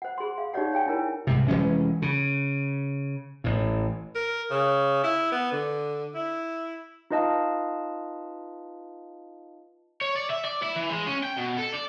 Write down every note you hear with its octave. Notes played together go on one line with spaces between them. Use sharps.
C5 F#5
G#4 C6
F5
D#4 G4 G#4 C#5 D5 F#5
C#5 F5 G5 G#5
D4 E4 A#4 C#5
C2 G#2 C3
F1 E3 G#3 C#4
C#3
A1 A2
A#4
C#3
E4
B3
D3
E4
D#4 F4 B4 D#5 F5 A5
C#5
D5
E5
D5
E4
E3
G#3
C#4
G5
B2
A4
D5